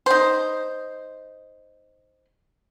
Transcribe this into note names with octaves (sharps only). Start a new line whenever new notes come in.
D#4 C5